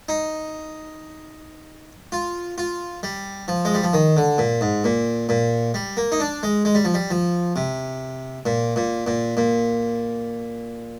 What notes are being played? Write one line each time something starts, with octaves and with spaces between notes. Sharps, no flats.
D#4
F4
F4
G3
F3
G#3
G3
F3
D#3
D3
A#2
G#2
A#2
A#2
G3
A#3
D#4
D4
G#3
G#3
G3
F3
G3
F3
C3
A#2
A#2
A#2
A#2